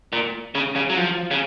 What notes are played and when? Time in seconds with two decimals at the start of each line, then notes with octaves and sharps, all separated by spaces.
0.13 A#2
0.55 C#3
0.76 C#3
0.90 F#3
0.97 F3
1.31 C#3